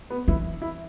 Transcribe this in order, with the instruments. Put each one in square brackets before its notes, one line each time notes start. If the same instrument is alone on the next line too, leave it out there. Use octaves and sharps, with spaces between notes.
[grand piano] B3
[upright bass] E3 [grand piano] E4
[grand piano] E4